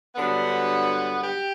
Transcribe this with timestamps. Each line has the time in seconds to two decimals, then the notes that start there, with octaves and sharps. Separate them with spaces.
0.16 G2 D3 F#3 B3
1.24 G4